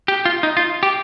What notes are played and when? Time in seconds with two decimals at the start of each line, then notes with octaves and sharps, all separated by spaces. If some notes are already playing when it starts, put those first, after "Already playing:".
0.08 G4
0.25 F4
0.43 D#4
0.57 F4
0.83 G4